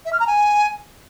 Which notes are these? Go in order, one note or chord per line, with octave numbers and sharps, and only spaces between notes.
E5
F6
A#5
G#5